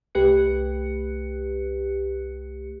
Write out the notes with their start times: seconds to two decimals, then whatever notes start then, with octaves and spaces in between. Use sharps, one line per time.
0.15 C2 A3 G4 B4 F#6 C#7